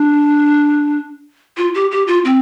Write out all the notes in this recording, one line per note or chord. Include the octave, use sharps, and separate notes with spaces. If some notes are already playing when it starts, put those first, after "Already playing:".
Already playing: D4
F4
G4
G4
F4
C4